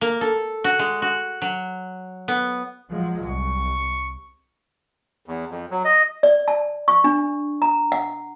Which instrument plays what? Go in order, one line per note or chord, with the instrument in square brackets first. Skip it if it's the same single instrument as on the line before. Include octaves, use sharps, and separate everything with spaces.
[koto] A#3
A4
F#4
G#3
F#4
F#3
B3
[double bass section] F3 F#3 G#3
[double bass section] C2 [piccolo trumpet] C#6
[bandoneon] E2
F2
F#3
D#5
[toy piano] D5
A5
C#6
D4
A#5
F#5